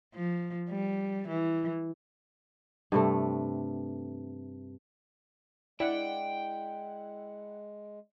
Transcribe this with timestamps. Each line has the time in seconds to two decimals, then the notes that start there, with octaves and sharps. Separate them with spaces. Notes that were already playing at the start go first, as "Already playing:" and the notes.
0.14 F3
0.69 G3
1.28 E3
2.92 G2 C3 A3
5.80 G#3 E4 D5 F#5 G5